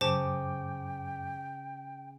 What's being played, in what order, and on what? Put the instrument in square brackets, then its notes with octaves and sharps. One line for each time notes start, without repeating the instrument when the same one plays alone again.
[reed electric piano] F#2 D6 [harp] C#3 [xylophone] C5 A5 [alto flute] G5